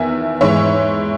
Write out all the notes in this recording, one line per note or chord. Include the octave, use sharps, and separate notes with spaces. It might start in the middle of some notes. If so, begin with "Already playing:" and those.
Already playing: E2 D#3 E5 G#5
G#2 E3 G#3 C#5 E5